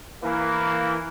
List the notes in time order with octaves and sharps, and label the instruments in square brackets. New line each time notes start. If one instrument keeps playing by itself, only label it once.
[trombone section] E3 A#3